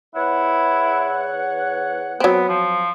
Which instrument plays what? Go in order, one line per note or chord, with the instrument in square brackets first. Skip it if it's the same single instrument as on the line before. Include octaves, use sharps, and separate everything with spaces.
[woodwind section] E2 C#5 F#5 [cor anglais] E4
[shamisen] F#3 C4 [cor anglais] B3
[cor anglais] F3